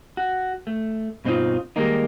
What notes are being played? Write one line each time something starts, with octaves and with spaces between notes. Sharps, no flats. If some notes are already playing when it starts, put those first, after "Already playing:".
F#4
A3
G2 B2 C4 C#4 D#4 F4
D#3 G3 G#3 A#3 D#4